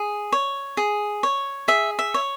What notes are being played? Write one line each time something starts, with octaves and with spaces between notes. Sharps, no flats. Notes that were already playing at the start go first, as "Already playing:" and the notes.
Already playing: G#4
C#5
G#4
C#5
G#4 E5
E5
C#5